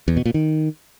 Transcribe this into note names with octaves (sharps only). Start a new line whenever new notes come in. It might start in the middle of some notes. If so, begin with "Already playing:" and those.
E2
B2
A#2
D#3